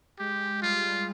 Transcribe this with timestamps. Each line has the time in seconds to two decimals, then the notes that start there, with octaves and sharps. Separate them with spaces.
0.19 G#3 G4
0.62 G3 F4